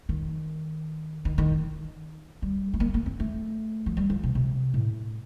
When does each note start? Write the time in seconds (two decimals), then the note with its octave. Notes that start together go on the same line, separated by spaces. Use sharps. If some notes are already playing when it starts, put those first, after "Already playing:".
0.09 D#3
1.25 D#3
1.38 D#3
2.42 G3
2.74 A3
2.80 A#3
2.94 A#3
3.06 C4
3.20 A3
3.86 F3
3.97 G3
4.10 F3
4.23 C3
4.35 C3
4.74 A2